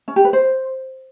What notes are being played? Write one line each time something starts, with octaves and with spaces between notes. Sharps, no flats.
C#4
G4
B4
C5